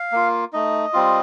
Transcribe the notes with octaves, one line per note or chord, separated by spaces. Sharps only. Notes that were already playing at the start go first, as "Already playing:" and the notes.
Already playing: F5
A#3 F4
A3 D#4 D#5
G3 C4 F4